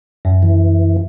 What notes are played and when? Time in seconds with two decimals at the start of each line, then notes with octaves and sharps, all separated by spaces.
0.25 F#2
0.43 E3